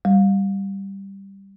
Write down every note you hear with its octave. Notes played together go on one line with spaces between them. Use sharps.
G3